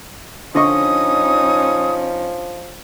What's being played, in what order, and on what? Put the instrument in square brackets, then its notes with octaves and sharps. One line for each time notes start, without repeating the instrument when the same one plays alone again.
[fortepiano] D3 D#5 C#6 [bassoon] F3 [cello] C#4 D#4 [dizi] D#6